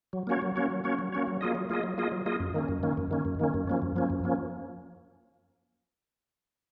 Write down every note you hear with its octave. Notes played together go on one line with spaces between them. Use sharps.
F#3
A#3 C#4 F#4 C#5
F#3
A#3 C#4 F#4 C#5
F#3
A#3 C#4 F#4 C#5
F#3
A#3 C#4 F#4 C#5
F#3
A#3 F4 G#4 D#5
F#3
A#3 F4 G#4 D#5
F#3
A#3 F4 G#4 D#5
F#3
A#3 F4 G#4 D#5
F#2
D#3 A#3 C#4
F#2
D#3 A#3 C#4
F#2
D#3 A#3 C#4
F#2
D#3 A#3 C#4
F#2
F3 A#3 C#4
F#2
F3 A#3 C#4
F#2
F3 A#3 C#4